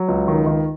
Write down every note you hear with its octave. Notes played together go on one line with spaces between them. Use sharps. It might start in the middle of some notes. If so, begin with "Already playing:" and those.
Already playing: F#3
C#2
D#3
D#3